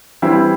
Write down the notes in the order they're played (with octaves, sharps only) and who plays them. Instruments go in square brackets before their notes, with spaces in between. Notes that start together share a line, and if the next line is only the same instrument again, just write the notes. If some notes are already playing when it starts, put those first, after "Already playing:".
[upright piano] E3 G3 C4 E4